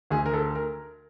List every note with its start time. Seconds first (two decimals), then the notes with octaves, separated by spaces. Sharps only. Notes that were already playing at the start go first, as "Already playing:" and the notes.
0.10 D2 G#4
0.26 A#4
0.34 A4
0.55 A#4